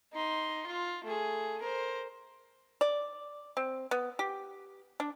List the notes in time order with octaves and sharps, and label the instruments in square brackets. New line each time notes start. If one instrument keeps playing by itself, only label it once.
[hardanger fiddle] D#4 C6
F4
A3 G#4
A#4 C5
[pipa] D5
C4
B3
G4
D4